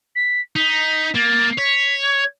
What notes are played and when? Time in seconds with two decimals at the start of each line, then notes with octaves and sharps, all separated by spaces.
0.15 B6
0.56 D#4 B6
1.15 A#3 A6
1.58 C#5 B6
2.02 G#6